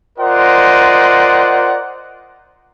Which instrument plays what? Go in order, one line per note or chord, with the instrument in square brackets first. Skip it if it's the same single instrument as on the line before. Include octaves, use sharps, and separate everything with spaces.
[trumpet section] F4 A#4 C5 D5 D#5 F#5